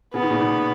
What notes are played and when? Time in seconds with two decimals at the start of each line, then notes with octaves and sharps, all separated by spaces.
0.14 C#3 B3
0.22 D#3
0.30 A#2 C#3
0.40 B2 D#3